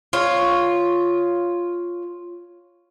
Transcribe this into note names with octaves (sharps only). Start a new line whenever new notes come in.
F4 C#5